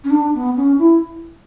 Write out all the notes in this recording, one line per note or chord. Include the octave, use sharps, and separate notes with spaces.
C#4
D4
B3
C#4
E4